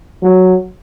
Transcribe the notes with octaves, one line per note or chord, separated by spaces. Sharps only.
F#3